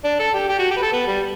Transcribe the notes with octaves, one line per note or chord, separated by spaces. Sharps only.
D4
A4
G4
G4
F#4
G4
B4
A4
B3
G3